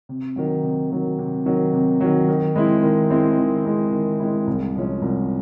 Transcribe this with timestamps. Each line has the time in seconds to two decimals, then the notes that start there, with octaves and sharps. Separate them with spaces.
0.09 C3
0.36 D#3 F#3
0.63 C3
0.91 D#3 F#3
1.18 C3
1.46 D#3 F#3
1.73 C3
2.01 D#3 F#3
2.28 D#3
2.55 G#3 C4 E4
2.83 D#3
3.10 G#3 C4 E4
3.38 D#3
3.65 G#3 C4 E4
3.92 D#3
4.20 G#3 C4 E4
4.47 C2
4.75 C3 F3 G#3 C#4
5.02 C2